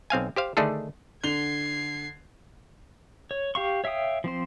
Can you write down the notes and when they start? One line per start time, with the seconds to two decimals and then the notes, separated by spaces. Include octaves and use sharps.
0.10 B1 C4 F5 G#5
0.36 G4 C5 F5
0.57 D3 D#3 A3 D4 G#4 A4
1.24 D3 G#6 C7 F7 G7
3.31 C#5
3.55 G4 F5 C#6
3.84 C#5 E5 F5 G5 D#6
4.24 F3 C4 C5